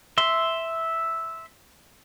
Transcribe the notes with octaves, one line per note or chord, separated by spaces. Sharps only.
E5 C6